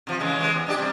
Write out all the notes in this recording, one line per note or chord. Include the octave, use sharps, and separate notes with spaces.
C3 F3
C#3 E3 G#3
E3 G#3
E2
G#3 D4 G4
C3 G3